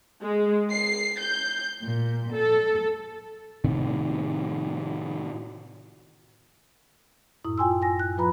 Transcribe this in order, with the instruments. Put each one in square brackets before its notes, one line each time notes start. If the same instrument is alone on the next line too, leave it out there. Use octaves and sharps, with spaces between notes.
[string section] G#3
C7
G6
A#2
A4
[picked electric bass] A2 C3 D#3
[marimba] F#2 A2 E4 D#6
F4 G5 G#5 C6 E6
G#5 A#6
F#6
F3 F4 B4 A#5 B5